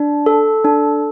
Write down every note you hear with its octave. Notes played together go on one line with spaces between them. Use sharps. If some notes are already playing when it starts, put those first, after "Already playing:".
Already playing: D4
A4
D4